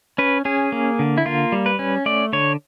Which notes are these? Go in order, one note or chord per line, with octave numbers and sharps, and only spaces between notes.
C#4 B4
C#4 G#4
A#3
D3
E4
A#3 F4
G3
B4
C#4
A3 D5
D3 C#5